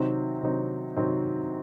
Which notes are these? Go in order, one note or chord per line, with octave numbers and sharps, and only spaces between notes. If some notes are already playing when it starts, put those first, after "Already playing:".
Already playing: C3 D#3 F#3 C4 D#4
C3 D#3 F#3 C4 D#4
C3 D#3 F#3 C4 D#4